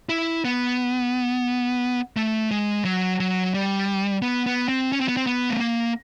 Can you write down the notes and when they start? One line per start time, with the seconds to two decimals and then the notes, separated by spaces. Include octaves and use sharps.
0.09 E4
0.45 B3
2.16 A3
2.51 G#3
2.84 F#3
3.20 F#3
3.54 G3
4.22 B3
4.46 B3
4.68 C4
4.92 C#4
5.01 C4
5.08 B3
5.17 C4
5.26 B3
5.50 A3
5.60 A#3